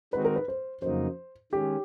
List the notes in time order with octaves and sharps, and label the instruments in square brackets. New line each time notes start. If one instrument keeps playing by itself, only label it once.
[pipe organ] D#3 G#3 C4 D#4 F#4 [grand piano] B4
[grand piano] A#4
B4
C5
[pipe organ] F2 C#3 F#3 A#3 D#4 [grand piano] C5
[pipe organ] D#3 G#3 C#4 [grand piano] G4